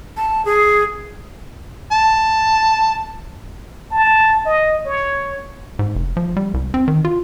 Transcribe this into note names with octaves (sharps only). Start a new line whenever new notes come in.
A5
G#4
A5
A5
D#5
C#5
G#2
F1
F3
G3
C2
C4
D#3
F4